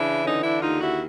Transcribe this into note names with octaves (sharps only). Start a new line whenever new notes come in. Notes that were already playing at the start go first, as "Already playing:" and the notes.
Already playing: C#3 E3 D4 E4
D3 C#4 D#4
D4 E4
D#2 D#4 F4
E4 F#4